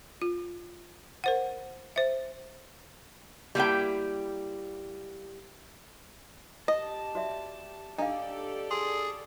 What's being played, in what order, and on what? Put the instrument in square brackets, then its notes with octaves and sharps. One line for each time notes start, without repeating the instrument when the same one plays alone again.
[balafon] F4
A#4 C5 F#5
C5 E5
[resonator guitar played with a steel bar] G3 A#3 E4 G5
[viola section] G4 A5 [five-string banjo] D#5
[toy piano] F#4 D5 E5
[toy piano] D4 F5 [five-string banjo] D#4 [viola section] G4 A4 D5
[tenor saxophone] G#4 [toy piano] C6